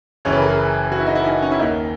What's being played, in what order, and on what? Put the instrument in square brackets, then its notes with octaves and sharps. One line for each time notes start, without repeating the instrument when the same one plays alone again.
[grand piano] F#1 F#2 C#3 E3 C#5
B4
A#4
G#4
F#4
E4
D#4
E4
D#4
C#4
E4
D#2 D#3 D#4